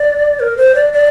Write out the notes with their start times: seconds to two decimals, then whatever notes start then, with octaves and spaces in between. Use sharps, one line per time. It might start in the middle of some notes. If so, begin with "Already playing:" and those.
Already playing: D5
0.40 A#4
0.57 C5
0.75 D5
0.93 D5